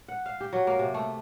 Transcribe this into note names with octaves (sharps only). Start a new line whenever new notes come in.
F#5
F5
G4
F#3
A#3
C3
A3